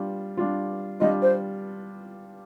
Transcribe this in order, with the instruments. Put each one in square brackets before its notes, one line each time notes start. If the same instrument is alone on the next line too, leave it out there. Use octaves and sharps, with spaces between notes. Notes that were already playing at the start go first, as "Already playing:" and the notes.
Already playing: [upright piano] G3 D4 F4
G3 D4 F4
[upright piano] G3 D4 F4 [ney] D#5
[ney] C5